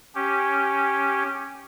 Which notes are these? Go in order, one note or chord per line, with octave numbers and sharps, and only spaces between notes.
C#4 G4